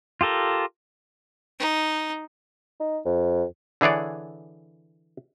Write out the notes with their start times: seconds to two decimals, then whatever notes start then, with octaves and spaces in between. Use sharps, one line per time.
0.21 F4 G4 A4 A#4
1.59 D#4
2.80 D#4
3.05 F2
3.81 D3 E3 G#4 C#5 D5